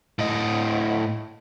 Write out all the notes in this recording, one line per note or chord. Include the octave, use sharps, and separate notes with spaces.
A2 D#5